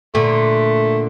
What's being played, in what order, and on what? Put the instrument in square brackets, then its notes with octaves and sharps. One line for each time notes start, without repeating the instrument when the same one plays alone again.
[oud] A#2 D3 [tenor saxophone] A3